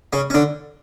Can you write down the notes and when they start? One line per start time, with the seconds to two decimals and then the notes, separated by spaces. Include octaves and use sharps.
0.13 C#3 C#4
0.30 C#4
0.34 D3 D4